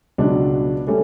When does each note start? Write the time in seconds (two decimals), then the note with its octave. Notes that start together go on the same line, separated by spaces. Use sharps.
0.18 C#2 B2 F#3 B3 D4
0.87 G3 A3 C#4